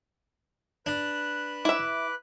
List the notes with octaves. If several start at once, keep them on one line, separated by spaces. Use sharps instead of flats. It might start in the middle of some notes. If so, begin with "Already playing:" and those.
D4 B4 F#6
E4 E5 D6